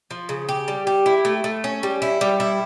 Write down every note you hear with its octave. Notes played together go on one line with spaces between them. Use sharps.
F3
C#3
G4
G3
G4
E4
A3
A3
C#4
G3
E4
G3
E4